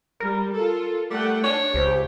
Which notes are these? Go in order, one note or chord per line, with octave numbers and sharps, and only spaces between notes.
G3 A#4
F4 A4
G3 A3 F#5 G5
D4 C#5
C#2 G4 C5